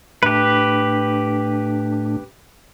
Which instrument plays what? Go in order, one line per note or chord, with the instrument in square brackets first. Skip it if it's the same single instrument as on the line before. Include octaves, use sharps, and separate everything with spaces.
[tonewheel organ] A2 A3 D4 [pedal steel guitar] G4 B4